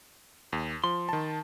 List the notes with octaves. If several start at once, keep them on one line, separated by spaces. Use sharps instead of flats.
D#2
F3 C6
D#3 A5